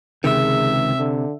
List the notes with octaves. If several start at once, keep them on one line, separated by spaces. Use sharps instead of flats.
C#2 G#2 C3 D#3 G#4 E5
D3